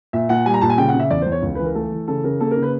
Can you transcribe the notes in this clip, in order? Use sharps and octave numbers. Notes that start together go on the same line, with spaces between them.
A#2 E5
A#2 F#5
G3 G#5
A#5
A#2 A5
G#5
C#3 G5
F#5
C#3
E5
E2 D5
C5
E2
C#5
C#2
E3 B4
A#4
A3 A4
E3
C#3 A4
C#3 A#4
A#3 A4
A#4
C#3
B4